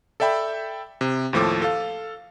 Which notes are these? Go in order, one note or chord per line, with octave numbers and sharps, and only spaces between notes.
A4 D5 E5 G5 B5
C3
D#2 A2 F3 A4 D6
A4 F5